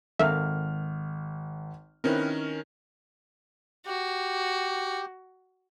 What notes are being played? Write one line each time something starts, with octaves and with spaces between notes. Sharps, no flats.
G#1 A4 A#4 E5 F5 F6
D#3 C4 C#4 E4 A#4 B4
F#4 G4